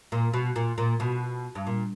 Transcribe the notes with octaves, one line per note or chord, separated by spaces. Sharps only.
A#2
B2
A#2
A#2
B2
G2
A#2